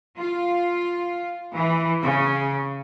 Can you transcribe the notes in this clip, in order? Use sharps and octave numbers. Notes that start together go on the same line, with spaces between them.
F4
E3
C#3